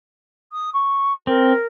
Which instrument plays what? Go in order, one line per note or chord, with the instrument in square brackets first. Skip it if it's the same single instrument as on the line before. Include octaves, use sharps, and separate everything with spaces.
[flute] D#6
C#6
[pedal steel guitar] C4 [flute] A#4